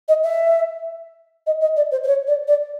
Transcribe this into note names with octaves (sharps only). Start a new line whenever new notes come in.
D#5
E5
D#5
D#5
D5
C5
C5
C#5
D5
D5